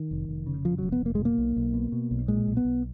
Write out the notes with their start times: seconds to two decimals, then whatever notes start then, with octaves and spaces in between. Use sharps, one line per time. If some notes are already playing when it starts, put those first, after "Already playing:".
Already playing: D#3
0.11 F1
0.29 F1
0.47 C#3
0.65 F2 F3
0.78 F1 F#3
0.92 B3
1.01 F1 A#3
1.15 G#3
1.20 B2
1.25 A#3
1.38 B1
1.56 B1
1.74 B2
1.92 B2
2.11 B1
2.28 A#2 G#3
2.47 B1
2.57 B3
2.65 B1